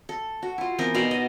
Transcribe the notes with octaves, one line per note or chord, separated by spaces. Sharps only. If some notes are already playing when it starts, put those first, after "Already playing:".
A4
F#4
E4 F4
E3 B3 C4 A#4
B2 D#4 D5 F5
D#5